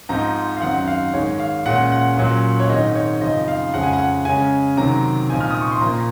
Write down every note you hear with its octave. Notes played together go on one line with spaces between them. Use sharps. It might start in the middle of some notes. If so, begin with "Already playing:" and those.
G#2 F3 C4 D#4 A#5
F5
F#2 D#3 F#3 C4 D#4 F#5
F#5
F5
G#2 D#3 G#3 C#5
F5
A#2 G#3 C#4 F#5
F#5
A#2 F#3 C#4
C#5
G#2 D#3 G#3 C4 D#4 D#5
C#5
F#2 C#3 F3 C4 D#4 D#5
F5
F2 C#3 G#3 C#4 F#5
G#5
F#5
C#3 G#3 C#4 G#5
C3 D#3 F#3 A#5
A#2 F3 C4 D#4 G#5
F6
D#6
C#6
C6
A#2 F3 A#3 A#5